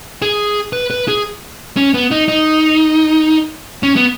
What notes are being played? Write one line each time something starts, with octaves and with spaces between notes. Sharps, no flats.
G#4
B4
B4
G#4
C#4
B3
D#4
D#4
C#4
B3